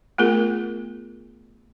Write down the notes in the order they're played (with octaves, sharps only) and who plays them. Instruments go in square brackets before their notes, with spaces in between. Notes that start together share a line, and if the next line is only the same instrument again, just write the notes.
[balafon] A3 B3 F4 G#4 A#4